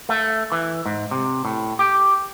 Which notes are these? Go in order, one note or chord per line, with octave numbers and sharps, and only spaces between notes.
A3
E3
G#2
C3
A2
G4